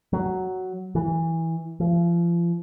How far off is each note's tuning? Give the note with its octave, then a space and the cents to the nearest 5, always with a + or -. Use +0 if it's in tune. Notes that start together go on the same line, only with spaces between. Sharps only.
F#3 +5
E3 -10
F3 -35